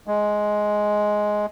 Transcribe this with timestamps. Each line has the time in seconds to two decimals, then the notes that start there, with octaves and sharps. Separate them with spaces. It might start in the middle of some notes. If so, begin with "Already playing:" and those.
0.07 G#3